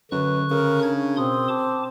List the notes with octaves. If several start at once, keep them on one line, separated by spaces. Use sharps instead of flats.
F#2 D3 B4 C#6 F#6
C#3 A#4
D4 G#6
B2 C4 C6 D#6
A5 D6